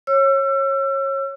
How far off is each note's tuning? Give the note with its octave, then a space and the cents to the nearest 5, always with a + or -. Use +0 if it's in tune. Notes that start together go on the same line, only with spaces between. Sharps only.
C#5 -25 E6 +35